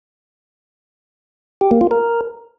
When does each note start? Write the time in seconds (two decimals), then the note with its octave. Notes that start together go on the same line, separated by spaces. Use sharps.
1.61 G4
1.71 A#3
1.81 F4
1.91 A#4